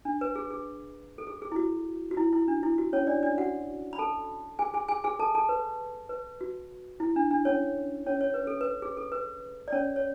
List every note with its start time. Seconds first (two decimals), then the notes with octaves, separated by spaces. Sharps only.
0.05 D4
0.21 B4
0.36 G#4
0.50 G#4
1.18 A4
1.27 G#4
1.42 G#4
1.52 E4
1.56 F#4
2.11 F#4
2.17 E4
2.33 E4
2.48 D4
2.63 E4
2.78 F#4
2.93 C#4 C#5
3.07 D4 D5
3.23 D4 D5
3.38 F#4 F#5
3.93 B5
3.98 A4 A5
4.59 G#4 G#5
4.74 G#4 G#5
4.88 G#4 G#5
5.04 G#4 G#5
5.19 A4 A5
5.35 A4 A5
5.49 B4
6.09 B4
6.41 F#4
7.00 E4
7.16 D4
7.31 D4
7.45 C#4 C#5
8.06 C#4 C#5
8.21 C#5
8.34 B4
8.47 A4
8.61 B4
8.82 G#4
8.97 A4
9.12 B4
9.68 D5
9.72 C#4 C#5
9.96 C#5